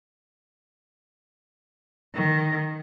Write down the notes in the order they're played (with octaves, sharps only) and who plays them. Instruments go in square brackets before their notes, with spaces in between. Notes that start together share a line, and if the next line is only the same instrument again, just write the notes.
[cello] D#3